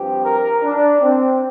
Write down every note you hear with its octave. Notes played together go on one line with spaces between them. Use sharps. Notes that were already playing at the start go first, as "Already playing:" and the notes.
Already playing: G2 F3 C4 G4
A#4
D4
C4